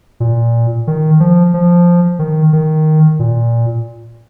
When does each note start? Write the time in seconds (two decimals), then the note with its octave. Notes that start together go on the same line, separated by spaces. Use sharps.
0.20 A#2
0.87 D#3
1.20 F3
1.54 F3
2.19 D#3
2.53 D#3
3.19 A#2